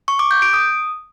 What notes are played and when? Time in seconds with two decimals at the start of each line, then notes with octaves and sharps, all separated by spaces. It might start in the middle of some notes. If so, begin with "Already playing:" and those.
0.08 C#6
0.19 D6
0.31 G6
0.42 D7
0.53 D#6